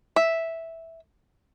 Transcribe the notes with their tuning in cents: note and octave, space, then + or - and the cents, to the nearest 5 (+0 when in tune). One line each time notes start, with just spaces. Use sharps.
E5 -5